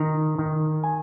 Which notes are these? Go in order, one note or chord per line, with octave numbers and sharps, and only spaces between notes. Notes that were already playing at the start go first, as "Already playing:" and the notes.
Already playing: D#3 A#5
D#3
G#5